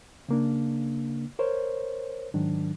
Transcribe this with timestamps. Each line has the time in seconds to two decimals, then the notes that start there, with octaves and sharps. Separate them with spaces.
0.29 C#3 A#3 D4
1.39 A#4 C5 C#5
2.34 G#2 D#3 F#3 D4